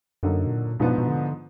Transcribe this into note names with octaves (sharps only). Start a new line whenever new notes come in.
F#2 D3 F#3 A#3 D#4
B2
A#2
G#2 B2 F3 B3 D4
B2
D3